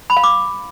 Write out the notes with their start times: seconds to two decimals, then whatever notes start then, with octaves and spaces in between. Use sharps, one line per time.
0.10 B5
0.17 F5
0.24 D6